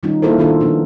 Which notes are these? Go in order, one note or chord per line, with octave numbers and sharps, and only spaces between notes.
D#3 G3 B3 C#4 D#4 F4
A#3 E4 F4 A4 A#4 C5
D#3 B3 D4 F4 A4 A#4
D#3 F3 B3 D4